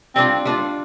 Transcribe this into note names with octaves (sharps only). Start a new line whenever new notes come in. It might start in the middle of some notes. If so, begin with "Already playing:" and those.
G3 C4 D4 F4
G3 D4 F4